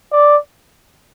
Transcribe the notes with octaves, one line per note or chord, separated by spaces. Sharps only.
D5